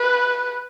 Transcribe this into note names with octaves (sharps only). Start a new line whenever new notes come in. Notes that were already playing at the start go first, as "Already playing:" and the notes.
Already playing: B4